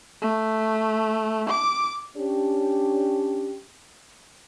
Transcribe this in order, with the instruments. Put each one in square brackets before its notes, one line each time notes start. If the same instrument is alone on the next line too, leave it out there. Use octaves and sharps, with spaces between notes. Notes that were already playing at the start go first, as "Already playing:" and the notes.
[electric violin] A3
D6
[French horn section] C#4 D4 G4